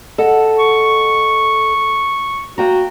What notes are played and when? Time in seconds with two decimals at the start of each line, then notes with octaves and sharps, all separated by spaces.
0.18 A4 D#5 F#5
0.59 C#6
2.58 A#3 F#4 G5 A#5